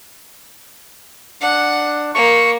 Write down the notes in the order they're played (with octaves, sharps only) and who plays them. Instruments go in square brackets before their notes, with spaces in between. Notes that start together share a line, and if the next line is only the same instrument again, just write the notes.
[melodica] D4 [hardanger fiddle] F#5
[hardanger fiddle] A#3 [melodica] C#6